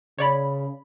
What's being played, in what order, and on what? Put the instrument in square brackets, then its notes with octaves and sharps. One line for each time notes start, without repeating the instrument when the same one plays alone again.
[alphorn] C#3 [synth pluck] C#5 D5 B5